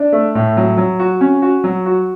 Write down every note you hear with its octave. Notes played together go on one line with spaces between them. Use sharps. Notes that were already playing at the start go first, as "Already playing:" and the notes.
Already playing: D4
A3
A2
F#3
F#3
F#4
C#4
F#4
F#3
F#4